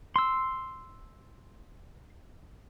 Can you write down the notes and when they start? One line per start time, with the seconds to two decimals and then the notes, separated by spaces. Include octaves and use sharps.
0.16 C6 E6